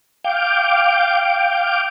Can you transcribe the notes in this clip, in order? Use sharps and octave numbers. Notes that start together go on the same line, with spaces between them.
F5 G5 D6